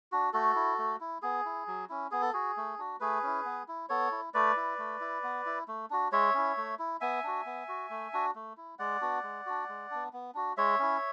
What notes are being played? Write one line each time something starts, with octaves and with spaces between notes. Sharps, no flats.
D4 F#4
A3 F#4 A4
E4
A3
E4
B3 G#4
E4
F#3
C#4 E4
B3 G#4
A4
F#4 G#4
A3
D4 F#4
A3 G#4 B4
C#4 E4
B3
E4
B3 A4 C#5
E4
A3 B4 D5
E4
A3
E4
B3
E4
A3
D4 F#4
G#3 C#5 E5
C#4 E4
A3
E4
B3 E5 G#5
D4 F#4
B3
F#4
A3
D4 F#4
A3
E4
G#3 D5 F#5
B3 D4 F#4
G#3
D4 F#4
G#3
B3 D4
B3
D4 F#4
G#3 C#5 E5
C#4 E4